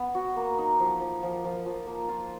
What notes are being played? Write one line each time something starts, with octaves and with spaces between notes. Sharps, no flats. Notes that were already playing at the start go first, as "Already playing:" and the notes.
Already playing: B3 B4
F#4
A#3
D#4
F3
F3
F3
F3
F3
A#3
F4